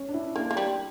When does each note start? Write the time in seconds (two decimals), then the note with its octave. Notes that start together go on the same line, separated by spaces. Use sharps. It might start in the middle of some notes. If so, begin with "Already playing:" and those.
Already playing: C#4
0.09 D4
0.14 E4
0.36 A#3 D4
0.51 A#3
0.57 G3